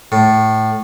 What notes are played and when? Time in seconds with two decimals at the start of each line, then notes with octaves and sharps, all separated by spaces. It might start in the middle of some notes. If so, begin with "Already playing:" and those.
0.12 A2